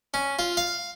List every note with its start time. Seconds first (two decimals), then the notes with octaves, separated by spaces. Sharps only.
0.14 C#4
0.39 F4
0.57 F5